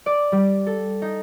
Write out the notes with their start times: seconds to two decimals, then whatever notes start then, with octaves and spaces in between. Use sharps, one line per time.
0.06 D5
0.32 G3
0.67 A4
1.02 D#4